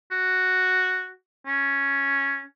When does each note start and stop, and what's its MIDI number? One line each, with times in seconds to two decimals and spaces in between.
0.11 1.10 66
1.46 2.44 61